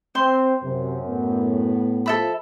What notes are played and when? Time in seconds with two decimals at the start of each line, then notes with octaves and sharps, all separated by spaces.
0.15 C4 C5 C6
0.63 F#2 C3
1.05 A2 B3
2.06 F3 A4 E5 B5